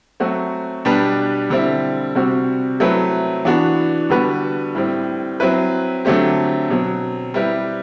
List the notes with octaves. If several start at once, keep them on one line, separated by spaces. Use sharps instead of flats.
F#3 A3 C4 F#4
B2 G3 D4 G4 B4
D3 G3 C4 E4
C3 G3 C4 F#4
F#3 A3 C4 E4 B4
E3 B3 D4 F#4
D3 G3 B3 F#4 B4
A2 G3 C4
F#3 C4 E4 B4
D3 F#3 A3 C4 G4
B2 F#3 C4
G3 C4 E4 G4 B4